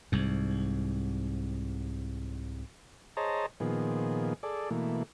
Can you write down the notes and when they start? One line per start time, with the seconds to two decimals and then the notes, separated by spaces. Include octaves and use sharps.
0.12 C2 G#2
3.17 G#4 C5 C#5 D#5 A5 A#5
3.60 A#2 D#3 F3 B3 G#4
4.43 G#4 A4 D5
4.70 B2 E3 A3 A#3